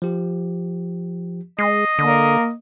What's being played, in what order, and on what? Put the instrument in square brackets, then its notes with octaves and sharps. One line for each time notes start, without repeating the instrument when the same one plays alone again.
[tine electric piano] F3 G4
[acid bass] G#3 [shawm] D#5 [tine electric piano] C7
[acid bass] D3 [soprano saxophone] A#3